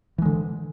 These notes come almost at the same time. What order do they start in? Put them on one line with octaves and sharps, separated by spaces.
E3 G#3 D3